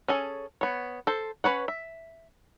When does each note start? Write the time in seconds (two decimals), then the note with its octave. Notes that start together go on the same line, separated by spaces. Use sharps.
0.08 C#4 G#4 A4
0.61 B3 C#5
1.07 A4 C5
1.44 C#4 B4 C#5 F#5
1.68 E5